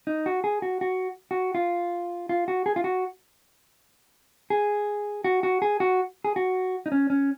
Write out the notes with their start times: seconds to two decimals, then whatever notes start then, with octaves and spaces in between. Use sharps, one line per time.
0.07 D#4
0.26 F#4
0.44 G#4
0.62 F#4
0.81 F#4
1.31 F#4
1.55 F4
2.29 F4
2.48 F#4
2.66 G#4
2.76 F4
2.84 F#4
4.50 G#4
5.24 F#4
5.43 F#4
5.62 G#4
5.80 F#4
6.24 G#4
6.36 F#4
6.86 D#4
6.92 C#4
7.10 C#4